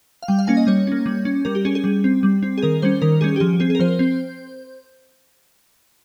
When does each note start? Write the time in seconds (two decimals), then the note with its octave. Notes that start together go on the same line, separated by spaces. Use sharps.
0.23 F5
0.28 G3 G5
0.39 F5
0.47 A#3 C#4 G#5
0.57 D#5
0.67 G3 C#5
0.87 A#3 C#4
1.06 G3
1.25 C#4
1.45 G3 A#4
1.55 G4
1.65 C#4 G#4
1.75 G#4
1.84 G3
2.04 C4
2.23 G3
2.43 C4
2.58 G#4
2.63 D#3 A#4
2.82 G3 C#4 C5
3.02 D#3 A#4
3.21 G3 C#4 G#4
3.36 G4
3.40 F3 G#4
3.60 C4 G#4
3.70 G#4
3.75 A#4
3.80 F3 C5
3.99 C4